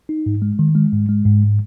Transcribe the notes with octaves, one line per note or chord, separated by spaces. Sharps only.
D#4
G#2
G#3
D#3
G#3
G#2
G#3
G#2